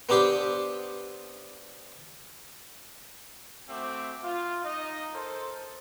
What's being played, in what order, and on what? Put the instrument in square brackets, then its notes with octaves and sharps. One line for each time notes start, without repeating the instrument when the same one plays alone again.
[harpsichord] B3 C4 D4 G4 C5
[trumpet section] A3 C4 F#4 E5 D6
F4
D#4 D#5
A4 A#4 C5